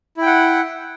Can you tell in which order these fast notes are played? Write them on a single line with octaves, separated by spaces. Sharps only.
E4 G5 F#5